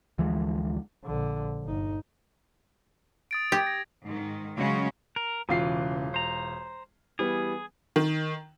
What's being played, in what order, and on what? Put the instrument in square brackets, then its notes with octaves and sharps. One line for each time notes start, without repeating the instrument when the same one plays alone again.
[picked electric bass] D2 E3 F3 G#3
[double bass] A#1 D3
G1 D#4
[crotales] D#6 A6 D7
[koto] G4 [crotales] G#6
[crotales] A#6
[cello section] G#2 D#3
C#3 F#3 G#3 C#4 F#4
[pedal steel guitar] A#4
[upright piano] E1 F4 C7 [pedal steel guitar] C#3 E3
[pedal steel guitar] C5 A#5
[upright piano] E3 G3 B3 [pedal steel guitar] G#4
[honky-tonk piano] D#3